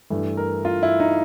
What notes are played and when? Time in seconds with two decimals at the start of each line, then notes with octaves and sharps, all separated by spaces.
0.10 G2 E3 A3
0.37 A#4
0.65 F4
0.83 E4
1.00 D#4